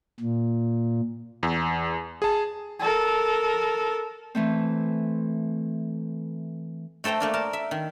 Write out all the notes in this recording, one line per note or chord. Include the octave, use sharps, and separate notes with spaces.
A#2
E2
G#4 A5
A4 A#4
E3 A3 C4
A3 A4 C5 G5 A#5
A3 A#3 D4
A#4 A5
E5
D#3